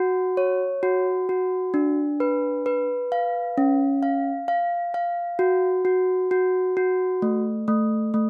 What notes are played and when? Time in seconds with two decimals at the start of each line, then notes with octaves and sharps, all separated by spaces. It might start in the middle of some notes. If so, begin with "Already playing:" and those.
Already playing: F#4
0.37 C#5
0.83 F#4
1.29 F#4
1.74 D4
2.20 B4
2.66 B4
3.12 F5
3.58 C#4
4.03 F5
4.48 F5
4.94 F5
5.39 F#4
5.85 F#4
6.31 F#4
6.77 F#4
7.22 A3
7.68 A3
8.14 A3